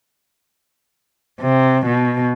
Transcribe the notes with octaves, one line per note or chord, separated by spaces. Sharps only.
C3
B2